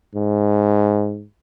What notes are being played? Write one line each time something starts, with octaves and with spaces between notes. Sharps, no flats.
G#2